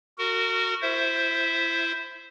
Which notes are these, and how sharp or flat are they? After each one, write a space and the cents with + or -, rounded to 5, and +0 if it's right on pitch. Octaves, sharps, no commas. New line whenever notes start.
F#4 +0 A#4 -30
E4 +30 C5 +0 E5 +0